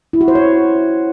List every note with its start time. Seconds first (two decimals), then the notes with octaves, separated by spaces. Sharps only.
0.13 E4
0.21 F#4
0.28 C5
0.35 C#5